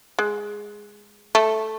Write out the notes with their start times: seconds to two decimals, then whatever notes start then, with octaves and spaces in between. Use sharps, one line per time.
0.19 G#3
1.35 A3